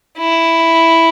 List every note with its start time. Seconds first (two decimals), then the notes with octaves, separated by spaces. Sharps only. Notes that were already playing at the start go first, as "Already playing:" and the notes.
0.18 E4